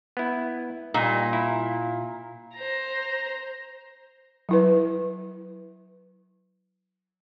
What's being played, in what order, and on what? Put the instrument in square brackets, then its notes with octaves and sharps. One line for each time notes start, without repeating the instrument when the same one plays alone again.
[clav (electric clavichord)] B3 E4
[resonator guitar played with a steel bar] A#2 [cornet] G3 [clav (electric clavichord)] D#4
[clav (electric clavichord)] E4 [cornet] F5
[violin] C5 A#5
[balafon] F#3 E4 B4